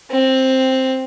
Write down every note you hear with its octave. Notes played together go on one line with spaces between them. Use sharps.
C4